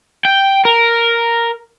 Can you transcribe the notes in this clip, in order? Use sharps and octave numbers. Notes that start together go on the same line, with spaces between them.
G5
A#4